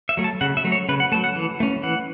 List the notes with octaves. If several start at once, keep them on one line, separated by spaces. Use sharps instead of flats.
E5
F#3 A3
A5
C#3 F#5
E5
F#3 A3
C#5
C#3 B4
F#5
F#3 A3 A5
F#5
E3
A3 C#4
E3 F#5